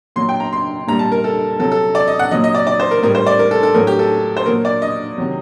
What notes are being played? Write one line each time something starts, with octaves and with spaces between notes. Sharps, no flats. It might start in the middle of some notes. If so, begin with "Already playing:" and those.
A#2 F#3 C6
G5
A#5
C6
A#2 G3 A#5
A5
A#4
A4
C3 F#3 A4
A4
D5
D#5
F#5
A#2 F#3 D#5
D#5
D5
D5
C5
A#4
A2 G3 A#4
C5
D5
A#4
A4
A4
A2 F#3 A#4
G4
A4
C5
A#2 F#3 A#4
D5
D#5
C3 D#3 F#3